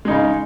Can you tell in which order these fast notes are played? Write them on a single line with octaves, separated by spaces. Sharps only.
G#3 D#4 C#3